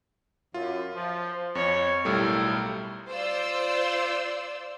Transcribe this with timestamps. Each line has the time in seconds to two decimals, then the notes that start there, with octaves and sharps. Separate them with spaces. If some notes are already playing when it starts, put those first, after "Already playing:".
0.54 F#2 F4
0.95 F3
1.55 F2 C#5
2.05 B1 A2 G3 A4 A#4
3.09 F4 C5 D5 E6